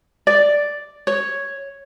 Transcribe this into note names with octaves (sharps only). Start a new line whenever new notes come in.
D5
C#5